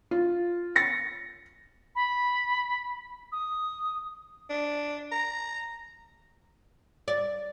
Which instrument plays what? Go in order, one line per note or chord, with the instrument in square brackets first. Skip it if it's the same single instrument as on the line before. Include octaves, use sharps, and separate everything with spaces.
[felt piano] F4
A6 A#6 C#7
[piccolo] B5
D#6
[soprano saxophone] D4
A#5
[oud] D5